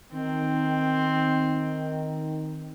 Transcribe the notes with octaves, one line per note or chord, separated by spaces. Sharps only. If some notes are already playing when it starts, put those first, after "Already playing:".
D#3 C4